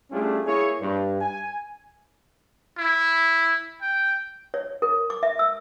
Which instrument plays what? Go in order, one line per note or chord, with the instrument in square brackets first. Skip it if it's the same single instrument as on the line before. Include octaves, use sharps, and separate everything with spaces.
[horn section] G3 A3 C#4 D4 F4 G#4
A#3 E4 G#4 C#5
G2
G#5
[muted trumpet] E4
G5
[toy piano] C#5
A#4
D6
E5
E6